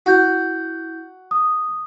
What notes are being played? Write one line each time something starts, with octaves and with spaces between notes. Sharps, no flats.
E4 F#4 G6
D#6